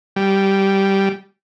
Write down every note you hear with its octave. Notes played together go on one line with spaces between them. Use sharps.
G3